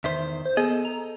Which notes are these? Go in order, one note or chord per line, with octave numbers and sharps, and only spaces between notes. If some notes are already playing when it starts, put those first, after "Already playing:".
E2 D#3 C5 E5
C5
B3 G#4 A4 D#5
A#5